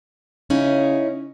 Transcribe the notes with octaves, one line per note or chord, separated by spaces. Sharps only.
C#3 C#4 D#4 E4